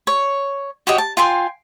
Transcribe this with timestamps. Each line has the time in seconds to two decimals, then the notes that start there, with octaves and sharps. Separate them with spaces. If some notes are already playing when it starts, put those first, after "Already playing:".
0.07 C#5
0.87 F#4 G4 C#5 D#5
0.98 A5
1.17 F4 G5 G#5 C6